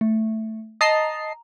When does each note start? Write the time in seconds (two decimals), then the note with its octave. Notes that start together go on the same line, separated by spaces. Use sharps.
0.01 A3
0.81 D#5 A5 A#5 C7